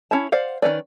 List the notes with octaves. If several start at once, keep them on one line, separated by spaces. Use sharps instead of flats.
C#4 E4 A5
C5 D5 F5 F#5
D#3 C4 C#4 B4 D5